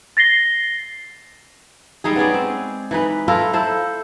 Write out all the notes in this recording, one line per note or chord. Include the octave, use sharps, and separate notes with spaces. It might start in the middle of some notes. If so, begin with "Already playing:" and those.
A6 A#6 C7 G7
G3 G#3 D#4 G#4
B3 C#4 G#4 D5
C4
E3 D#4 B4
E4 F4 A4 A#4
E4 A4 C5